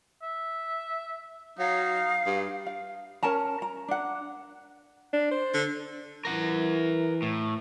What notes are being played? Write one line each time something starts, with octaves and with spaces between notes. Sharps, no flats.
E5
F#3 D#4 F5
G2
F5
C#4 A#4 A5 A#5
A#5
D4 F#5
D4
C5
D3
E3 A#4 F#5
A2